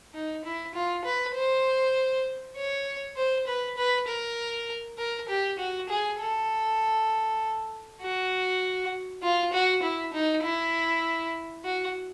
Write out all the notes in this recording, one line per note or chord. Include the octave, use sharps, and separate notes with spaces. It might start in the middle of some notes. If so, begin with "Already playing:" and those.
D#4
E4
F4
B4
C5
C#5
C5
B4
B4
A#4
A#4
G4
F#4
G#4
A4
F#4
F4
F#4
E4
D#4
E4
F#4